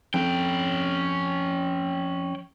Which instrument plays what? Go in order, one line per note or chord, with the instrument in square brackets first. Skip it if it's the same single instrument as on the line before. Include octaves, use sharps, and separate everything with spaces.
[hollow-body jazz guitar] F2 [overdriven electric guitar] C#4 G5